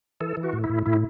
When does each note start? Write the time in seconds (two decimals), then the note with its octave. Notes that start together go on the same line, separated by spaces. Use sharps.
0.21 E3 A4
0.37 E3
0.43 F#4
0.53 A2
0.64 E4
0.69 A2
0.85 A2 E4